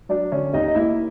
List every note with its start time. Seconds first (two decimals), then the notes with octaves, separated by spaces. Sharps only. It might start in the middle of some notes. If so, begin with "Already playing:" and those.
0.09 F#3 D4 D5
0.32 D3 C#4 C#5
0.53 D#2 D#4 D#5
0.68 D#5
0.75 A#3 E4 E5